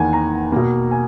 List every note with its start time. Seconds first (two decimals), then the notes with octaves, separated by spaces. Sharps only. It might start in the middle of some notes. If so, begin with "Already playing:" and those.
Already playing: E2 D#3 A#3 F#5 G#5
0.13 A#5
0.52 B2 A#3
0.91 G#5